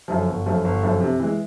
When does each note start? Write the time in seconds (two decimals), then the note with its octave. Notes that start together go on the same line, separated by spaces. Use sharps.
0.08 F#2 D3 F3
0.28 G1
0.46 F#2 D3 F3
0.65 G1
0.83 F#2 D3 F3
1.01 C3
1.19 E3 G#3